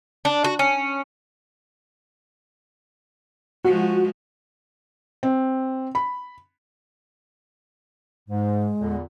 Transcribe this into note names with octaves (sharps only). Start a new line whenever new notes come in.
D4
F#4
C#4
F3 G#3 F#4
C4
B5
G#2 G#3
E2 A#2 D3